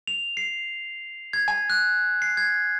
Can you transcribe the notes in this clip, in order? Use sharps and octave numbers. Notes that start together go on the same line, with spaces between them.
F7
C7
G#6
G#5
F#6
C7
G#6